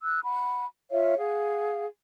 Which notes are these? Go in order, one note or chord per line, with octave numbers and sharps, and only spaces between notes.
E6 F#6
F#5 B5
F4 C#5 E5 F5
G#4 F5 F#5